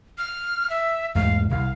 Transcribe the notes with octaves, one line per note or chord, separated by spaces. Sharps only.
F6
E5
E2 G#2 A3 F5
C2 F5